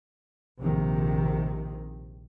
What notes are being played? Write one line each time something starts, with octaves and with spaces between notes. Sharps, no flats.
A#1 C3 D#3